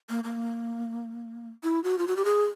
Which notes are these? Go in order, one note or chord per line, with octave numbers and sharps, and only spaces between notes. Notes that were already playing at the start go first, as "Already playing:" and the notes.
A#3
A#3
E4
F#4
F4
F#4
G4
G#4